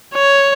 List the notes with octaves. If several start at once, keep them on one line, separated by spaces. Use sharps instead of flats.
C#5